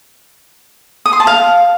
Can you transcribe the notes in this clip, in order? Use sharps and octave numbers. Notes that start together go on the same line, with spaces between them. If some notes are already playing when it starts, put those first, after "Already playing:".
D#6
C6
A5
F5